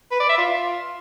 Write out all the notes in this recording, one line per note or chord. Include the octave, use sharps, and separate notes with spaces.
B4
D5
E5
F4